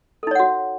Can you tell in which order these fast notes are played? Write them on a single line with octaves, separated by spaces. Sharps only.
A4 D#4 C#5 F#5 F#4